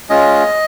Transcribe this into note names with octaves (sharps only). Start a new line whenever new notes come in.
G#3 C#4 F4 D#5